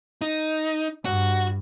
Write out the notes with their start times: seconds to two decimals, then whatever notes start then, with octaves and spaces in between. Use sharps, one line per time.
0.22 D#4
1.05 G2 F#4